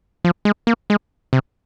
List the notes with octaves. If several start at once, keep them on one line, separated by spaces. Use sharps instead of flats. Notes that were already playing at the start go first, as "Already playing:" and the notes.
F3
G#3
A#3
G#3
C3